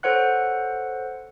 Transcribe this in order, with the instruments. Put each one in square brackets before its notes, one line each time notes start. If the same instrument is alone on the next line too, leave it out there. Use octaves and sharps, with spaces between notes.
[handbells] A4 C5 C#5 F#5 F#6